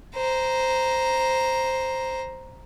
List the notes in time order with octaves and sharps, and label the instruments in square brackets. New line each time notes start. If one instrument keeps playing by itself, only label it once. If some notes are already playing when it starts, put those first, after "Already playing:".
[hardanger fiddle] C5 A#5